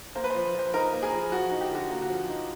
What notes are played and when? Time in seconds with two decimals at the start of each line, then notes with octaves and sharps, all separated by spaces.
0.15 A#3 C5
0.24 B4
0.30 F3 C5
0.54 F3 C5
0.73 D#4 A#4
0.93 A#3
1.02 G#4
1.12 F3
1.32 F3 F#4
1.51 D#4
1.61 G4
1.71 D3 F#4
1.88 A#3 F4
2.02 F#4
2.09 F3
2.29 D#4